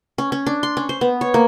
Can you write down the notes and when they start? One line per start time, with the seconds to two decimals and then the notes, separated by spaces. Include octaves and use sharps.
0.18 C#4
0.32 C#4
0.46 D4
0.63 C6
0.77 C#4
0.89 C5
1.01 B3
1.21 C#5
1.34 A#3